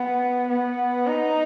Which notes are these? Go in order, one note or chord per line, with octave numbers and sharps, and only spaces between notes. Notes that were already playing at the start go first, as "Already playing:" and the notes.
Already playing: B3
B3
D#4